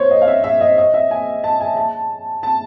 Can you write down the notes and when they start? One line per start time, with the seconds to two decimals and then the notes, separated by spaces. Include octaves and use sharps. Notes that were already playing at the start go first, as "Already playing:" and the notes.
Already playing: C5 C#5
0.11 D#5
0.21 F5
0.27 E5
0.44 E5
0.61 D#5
0.78 D#5
0.94 E5
1.11 G#5
1.44 A5
1.60 G#5
1.77 A5
2.43 A5